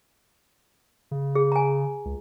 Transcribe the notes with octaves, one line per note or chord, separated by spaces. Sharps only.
C#3
G#4
G#5 A#5
C#2